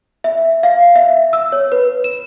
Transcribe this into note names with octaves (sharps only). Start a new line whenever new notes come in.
E5
F5
E5
E6
C#5
B4
E7